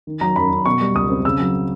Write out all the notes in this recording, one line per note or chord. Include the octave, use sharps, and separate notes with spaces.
D#3
F#3 A#5
F#2 B5
F#2
B2 C#6
G3
C#2 D#6
C4
C#3 E6
F#3